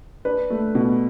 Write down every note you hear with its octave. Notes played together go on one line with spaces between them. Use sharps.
D4 B4
A3
B2